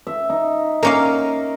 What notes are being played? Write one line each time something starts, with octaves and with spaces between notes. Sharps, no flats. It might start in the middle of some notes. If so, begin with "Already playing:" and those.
E5
D#4
A#3 C#4 A#4 F5